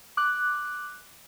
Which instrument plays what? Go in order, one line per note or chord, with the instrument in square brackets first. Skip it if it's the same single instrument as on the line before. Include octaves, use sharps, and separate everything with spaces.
[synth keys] D6 F#6